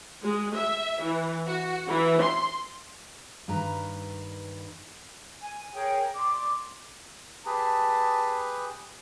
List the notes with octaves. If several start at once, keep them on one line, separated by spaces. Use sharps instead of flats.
G#3
E5
E3
F#4
E3
C6
G2 D#3 B4 A#5
G#5
G#4 A#4 C#5 G5
D5 C6 D6
G4 G#4 B4 A5